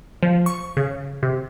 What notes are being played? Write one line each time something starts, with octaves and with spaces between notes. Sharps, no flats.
F3
C#6
C#3
C3